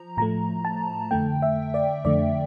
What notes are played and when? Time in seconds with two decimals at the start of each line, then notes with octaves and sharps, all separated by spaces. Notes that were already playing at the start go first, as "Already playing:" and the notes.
Already playing: F3 A#5
0.17 A2 F3 A3 A#5
0.65 A5
1.11 F2 D3 A3 G5
1.42 E5
1.74 D5
2.05 F2 D3 A3 D5